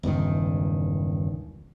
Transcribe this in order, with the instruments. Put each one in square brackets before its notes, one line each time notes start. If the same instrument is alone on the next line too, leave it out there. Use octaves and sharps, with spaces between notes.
[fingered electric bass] E1 C#2 G2 D#3